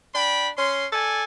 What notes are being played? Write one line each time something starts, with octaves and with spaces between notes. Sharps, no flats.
D4 G5 B5
C#4 C6
A4 D5 G#5